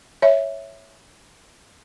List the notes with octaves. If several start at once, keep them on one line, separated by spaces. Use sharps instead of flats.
C#5 E5